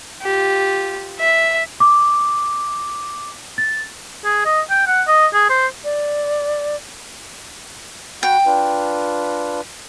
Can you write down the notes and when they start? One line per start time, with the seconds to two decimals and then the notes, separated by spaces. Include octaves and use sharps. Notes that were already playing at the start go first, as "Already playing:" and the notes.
0.22 F4 G4
1.19 E5
1.80 D6
3.58 A6
4.25 G#4
4.45 D#5
4.70 G5
4.87 F#5
5.08 D#5
5.34 G#4
5.50 C5
5.84 D5
8.23 F#4 F#5 G5 B5
8.46 D4 F4 B4